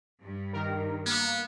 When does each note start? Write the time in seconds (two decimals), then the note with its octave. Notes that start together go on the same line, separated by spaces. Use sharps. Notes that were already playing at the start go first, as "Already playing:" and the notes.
0.23 G2
0.53 D#3 A#4
1.06 A#3 B3